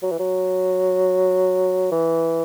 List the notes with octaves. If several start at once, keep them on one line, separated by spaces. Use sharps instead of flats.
F#3
E3
F#3
E3